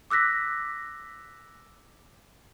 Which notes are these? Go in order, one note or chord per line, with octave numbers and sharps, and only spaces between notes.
D6 E6 F#6 A#6 B6